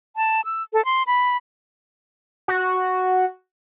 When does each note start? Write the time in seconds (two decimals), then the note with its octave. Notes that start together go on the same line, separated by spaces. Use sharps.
0.16 A5
0.45 E6
0.73 A4
0.85 C6
1.07 B5
2.48 F#4